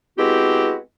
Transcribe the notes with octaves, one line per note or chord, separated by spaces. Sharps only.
G#3 B3 C4 E4 F#4 G4